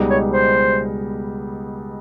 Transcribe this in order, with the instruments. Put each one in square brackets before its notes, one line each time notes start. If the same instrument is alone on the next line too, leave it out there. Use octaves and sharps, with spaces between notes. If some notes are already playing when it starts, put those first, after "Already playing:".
Already playing: [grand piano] C#2 B2 G3 B3 D#4
[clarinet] C#5
C5